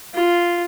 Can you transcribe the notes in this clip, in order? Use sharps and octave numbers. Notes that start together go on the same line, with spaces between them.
F4